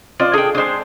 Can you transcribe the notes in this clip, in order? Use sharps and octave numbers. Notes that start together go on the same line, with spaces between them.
C4 F4 D5 D#5
D4 G#4 A4 G5
G#3 C4 D4 G#4 C5